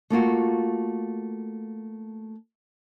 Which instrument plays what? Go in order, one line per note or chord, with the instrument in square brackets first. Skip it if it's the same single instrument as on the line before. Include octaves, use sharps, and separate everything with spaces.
[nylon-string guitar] A3 A#3 F4 F#4